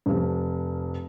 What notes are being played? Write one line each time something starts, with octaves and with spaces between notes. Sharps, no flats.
F1 F3